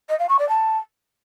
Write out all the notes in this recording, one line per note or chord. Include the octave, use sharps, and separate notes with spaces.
D#5
F5
C#6
D5
A5